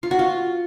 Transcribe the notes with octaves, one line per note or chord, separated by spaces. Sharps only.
F4
F#4
F4